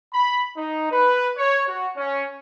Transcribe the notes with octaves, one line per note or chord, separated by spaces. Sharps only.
B5
D#4
B4
C#5
F#4
C#4